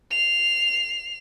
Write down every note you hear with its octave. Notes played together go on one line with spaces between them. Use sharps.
C7 F7